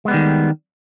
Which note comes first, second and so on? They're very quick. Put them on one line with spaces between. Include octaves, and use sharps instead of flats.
G#3 B3 G3 D#3